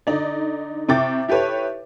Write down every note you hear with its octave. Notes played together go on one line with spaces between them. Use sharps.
D3 D#4 D5
C3 E4 G5 C#6 D6 A6
E4 G4 A4 B4 C#5